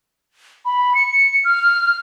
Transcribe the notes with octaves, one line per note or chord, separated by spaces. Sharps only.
B5
C#7
F6